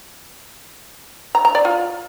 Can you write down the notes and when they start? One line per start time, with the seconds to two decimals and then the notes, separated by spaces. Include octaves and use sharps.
1.35 A#5
1.45 A#5
1.55 D5
1.65 F4